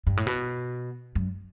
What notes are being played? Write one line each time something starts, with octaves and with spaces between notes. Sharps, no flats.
G2
A2
B2
F#2